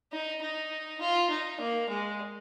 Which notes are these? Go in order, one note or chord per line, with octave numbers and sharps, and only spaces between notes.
D#4
D#4
F4
D#4
A#3
G#3